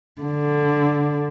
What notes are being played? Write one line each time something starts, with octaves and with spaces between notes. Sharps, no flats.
D3